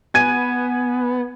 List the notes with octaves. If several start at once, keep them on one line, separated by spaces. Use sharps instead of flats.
B3 G#5 G#6 D#7